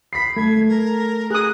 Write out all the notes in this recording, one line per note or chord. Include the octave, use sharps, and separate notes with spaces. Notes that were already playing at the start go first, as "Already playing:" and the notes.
B5 B6 C7
A3 G#6
A#4
G#4 D#6 F#6